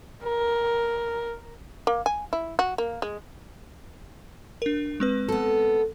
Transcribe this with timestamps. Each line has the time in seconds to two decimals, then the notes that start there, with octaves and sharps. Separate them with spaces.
0.24 A#4
1.87 A#3
2.06 G#5
2.33 E4
2.59 F#4
2.78 A#3
3.02 G#3
4.62 D4 A#4
5.00 G#3 C4 B4
5.28 B3 A4